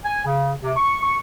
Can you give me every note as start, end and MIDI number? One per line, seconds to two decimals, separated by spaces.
0.04 0.22 80
0.25 0.51 49
0.62 0.71 48
0.77 1.00 85
1.03 1.16 85